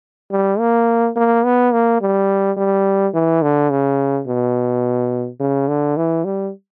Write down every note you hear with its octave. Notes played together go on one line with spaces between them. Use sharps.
G3
A#3
A#3
B3
A#3
G3
G3
E3
D3
C#3
B2
C#3
D3
E3
G3